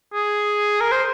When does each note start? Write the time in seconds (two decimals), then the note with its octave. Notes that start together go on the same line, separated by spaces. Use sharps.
0.13 G#4
0.80 A#4
0.92 C5